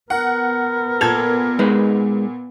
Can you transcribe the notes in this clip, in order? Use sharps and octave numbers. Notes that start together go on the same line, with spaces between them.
B3 A#4 F#5
A#2 A4 G#6 F7
G#3 D#4 B4